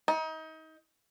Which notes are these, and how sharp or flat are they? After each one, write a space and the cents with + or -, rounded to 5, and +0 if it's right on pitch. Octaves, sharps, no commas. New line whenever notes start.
D#4 +30